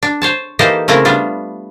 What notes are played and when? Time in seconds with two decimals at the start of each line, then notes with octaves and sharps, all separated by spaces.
0.03 D4
0.22 C5 C#5 A5
0.59 E3 A#3 D#4 G4 A4 C5
0.88 C#3 A3 A#3 C4 E4 A#4
1.05 G3 B3 D4 F4